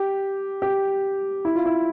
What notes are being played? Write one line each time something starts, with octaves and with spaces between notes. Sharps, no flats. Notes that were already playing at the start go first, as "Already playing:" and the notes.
Already playing: G4
G4
E4
F4
E4